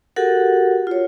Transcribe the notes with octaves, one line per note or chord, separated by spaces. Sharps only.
F#4 G4 A4 A#4 F#5
F4 C#5